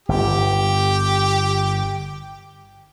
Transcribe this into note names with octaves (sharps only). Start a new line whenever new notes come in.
G1 G4